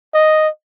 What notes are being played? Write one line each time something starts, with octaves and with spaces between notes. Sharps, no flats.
D#5